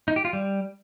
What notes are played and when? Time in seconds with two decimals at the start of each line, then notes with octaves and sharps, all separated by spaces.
0.08 D#4
0.16 G4
0.25 F4
0.33 G3